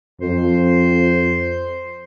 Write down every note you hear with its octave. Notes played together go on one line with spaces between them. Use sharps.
F2 C5